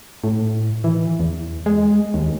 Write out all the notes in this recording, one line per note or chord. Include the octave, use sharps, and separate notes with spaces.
A2
E3
E2
G#3
D#2